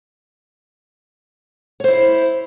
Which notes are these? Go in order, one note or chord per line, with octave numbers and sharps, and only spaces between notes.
E4 C5 C#5